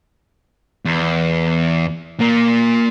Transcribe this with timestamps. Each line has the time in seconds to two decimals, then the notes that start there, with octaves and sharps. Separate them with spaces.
0.86 E2
2.19 A#2 A#3